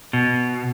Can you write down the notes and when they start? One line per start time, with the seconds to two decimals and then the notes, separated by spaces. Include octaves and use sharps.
0.13 B2